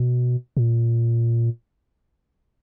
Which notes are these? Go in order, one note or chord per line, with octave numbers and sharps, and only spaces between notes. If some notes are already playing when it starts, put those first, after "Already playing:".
Already playing: B2
A#2